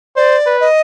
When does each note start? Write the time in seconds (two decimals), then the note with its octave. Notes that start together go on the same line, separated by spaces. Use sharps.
0.16 C5 D5
0.46 B4
0.60 D#5